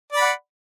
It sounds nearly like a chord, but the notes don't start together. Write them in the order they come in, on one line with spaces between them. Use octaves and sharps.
D5 B5 F#5